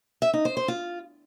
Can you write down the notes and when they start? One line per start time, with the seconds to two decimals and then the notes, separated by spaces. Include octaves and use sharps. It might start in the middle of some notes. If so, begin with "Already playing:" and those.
0.22 E5
0.33 D#4
0.45 C5
0.57 C5
0.68 F4